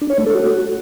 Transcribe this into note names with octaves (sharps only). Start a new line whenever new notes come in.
D4
C#5
A3
A4
F#4